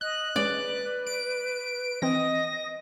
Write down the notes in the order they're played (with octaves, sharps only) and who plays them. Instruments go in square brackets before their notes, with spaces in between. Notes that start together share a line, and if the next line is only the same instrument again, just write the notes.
[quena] D#5 [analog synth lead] F#6
[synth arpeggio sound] G#3 C#4 [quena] B4 [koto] D5
[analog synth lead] D7
[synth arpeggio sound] E3 C4 [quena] D#5 [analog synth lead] A#6